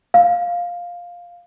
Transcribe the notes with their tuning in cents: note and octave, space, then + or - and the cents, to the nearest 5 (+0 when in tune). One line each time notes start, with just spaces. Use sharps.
F5 +5